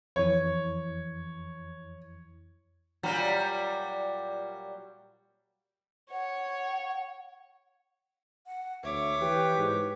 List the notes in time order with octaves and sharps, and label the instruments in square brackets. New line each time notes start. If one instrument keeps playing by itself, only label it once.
[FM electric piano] F2 E3 [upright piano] C#5
[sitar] A#2 F#3 G3
[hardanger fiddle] C#5 [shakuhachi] F#5
[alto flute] F#5
[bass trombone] D2 [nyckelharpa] C#5 D6 [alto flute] E5
[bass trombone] E3 [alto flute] G4 [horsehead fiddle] B4
[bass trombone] G#2